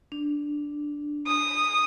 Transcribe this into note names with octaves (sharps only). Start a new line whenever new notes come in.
D4
D#6